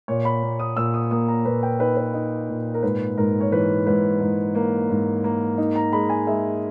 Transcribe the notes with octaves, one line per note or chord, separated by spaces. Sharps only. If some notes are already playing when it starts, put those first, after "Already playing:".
A#2 C#5
B5
A#3
D#6
A#2 E6
D#6
A#3 D#6
A#5
A#2 B4
G5
D#4 B4
B4
D#4
A#2
A#4
G#2 B4
G#2 A#4
C#5
E3 B4
G#2 B4
G#2
A#3
G#2
A#3
D#4
A#5
G#3 B5
G#5
G#3 E5